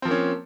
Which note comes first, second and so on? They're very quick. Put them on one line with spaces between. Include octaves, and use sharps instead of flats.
C4 F3 A#3 C#4